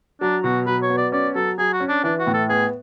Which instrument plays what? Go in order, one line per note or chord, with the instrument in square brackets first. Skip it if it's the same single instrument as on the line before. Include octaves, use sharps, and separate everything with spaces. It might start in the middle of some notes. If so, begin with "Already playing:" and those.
[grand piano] F#3 [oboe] D4
[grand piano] B2 [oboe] F#4
[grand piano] F#3 [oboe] B4
[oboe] C#5
[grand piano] B3
[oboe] D5
[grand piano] C#4 [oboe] D5
[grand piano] F#3 [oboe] A4
[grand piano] F#3 [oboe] G#4
[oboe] F#4
[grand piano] C#4
[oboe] D4
[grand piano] E3 [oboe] D4
[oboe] F#4
[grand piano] A2
[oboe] A4
[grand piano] B3 [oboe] G#4